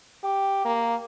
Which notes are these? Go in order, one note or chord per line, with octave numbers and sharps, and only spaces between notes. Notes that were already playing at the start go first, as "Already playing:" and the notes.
G4
A#3